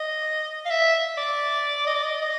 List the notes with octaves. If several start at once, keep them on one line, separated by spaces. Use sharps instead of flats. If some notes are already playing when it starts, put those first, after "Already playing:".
Already playing: D#5
F5
E5
D5
D#5
D5
D#5
D#5